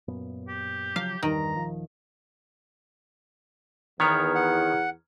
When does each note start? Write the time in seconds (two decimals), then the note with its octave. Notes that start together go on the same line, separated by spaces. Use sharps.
0.08 F#2 A#2 B3
0.48 G4
0.96 C#3 F3 F#3 F5
1.23 E2 G2 D#3 G3 A#5
1.56 D#1 F3
4.00 E2 D#3 B3 C#5 A#5 F6 G#6
4.35 F#5